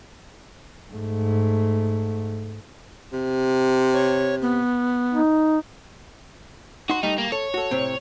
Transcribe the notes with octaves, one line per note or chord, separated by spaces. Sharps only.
G#2 A3
C3
C#5
B3
D#4
D#4 F#4 C6
G3 A3 D#4
A#3
A4 C#5
F#4 A4
A2 C3 C4